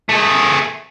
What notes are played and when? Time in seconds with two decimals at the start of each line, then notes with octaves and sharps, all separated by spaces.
0.09 A3 G#4